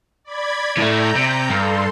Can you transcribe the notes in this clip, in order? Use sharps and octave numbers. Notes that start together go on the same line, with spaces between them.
D5 B5 G#6
A2 A3 A#5 G6
C3
G2 A4 C6